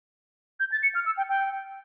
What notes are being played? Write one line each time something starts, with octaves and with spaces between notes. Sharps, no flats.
G6
A6
C#7
F6
E6
G5
G5